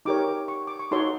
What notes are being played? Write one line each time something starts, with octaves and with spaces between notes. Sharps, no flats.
D#4 G4 A#4 C#5 D6
C#6
D6
C#6
D#4 F#4 A4 C#5 C6